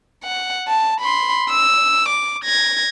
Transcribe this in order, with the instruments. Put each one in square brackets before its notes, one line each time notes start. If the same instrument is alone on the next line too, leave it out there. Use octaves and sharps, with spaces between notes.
[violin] F#5
A5
B5 C6
E6
D6
G#6 A#6